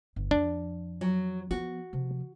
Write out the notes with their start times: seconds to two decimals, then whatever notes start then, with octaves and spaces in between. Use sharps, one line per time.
0.16 G1
0.31 F2 F3 D4
1.01 F#3
1.51 F3 B3 F#4
1.93 C3 F3